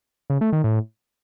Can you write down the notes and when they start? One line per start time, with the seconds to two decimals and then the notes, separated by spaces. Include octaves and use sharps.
0.30 C#3
0.41 A3
0.53 D#3
0.64 A2